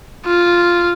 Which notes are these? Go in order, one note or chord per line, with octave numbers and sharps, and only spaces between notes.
F4